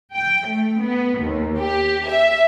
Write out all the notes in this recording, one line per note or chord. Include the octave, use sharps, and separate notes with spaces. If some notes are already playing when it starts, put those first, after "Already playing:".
G5
A3
B3
D#2
G4
E5